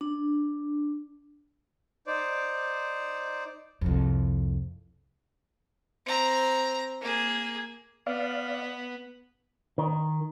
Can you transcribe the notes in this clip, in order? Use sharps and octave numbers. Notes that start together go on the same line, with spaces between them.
D4
D#4 C5 D5
C2 F2
C4 A#5
A#3 G#4
B3 D5 F5
D#3